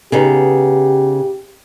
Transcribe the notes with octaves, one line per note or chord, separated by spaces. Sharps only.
C#3 B3 D#4 G4